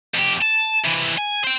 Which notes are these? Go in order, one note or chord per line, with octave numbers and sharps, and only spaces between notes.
F2 G4
A5
C3 E3
G#5
C5 G5